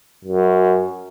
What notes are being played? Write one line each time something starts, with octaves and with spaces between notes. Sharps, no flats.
F#2